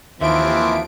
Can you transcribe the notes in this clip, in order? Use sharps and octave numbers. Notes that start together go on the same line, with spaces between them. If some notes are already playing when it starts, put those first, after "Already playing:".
D#2 E3 F3 C4 E5 D7